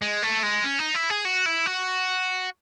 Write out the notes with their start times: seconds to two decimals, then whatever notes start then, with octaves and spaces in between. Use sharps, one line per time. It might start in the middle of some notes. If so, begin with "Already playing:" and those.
0.02 G#3
0.23 A3
0.43 G#3
0.64 C#4
0.79 D#4
0.95 E4
1.10 G#4
1.25 F#4
1.46 E4
1.66 F#4